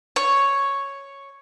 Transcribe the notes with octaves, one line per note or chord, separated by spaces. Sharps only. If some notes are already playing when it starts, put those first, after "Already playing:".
C#5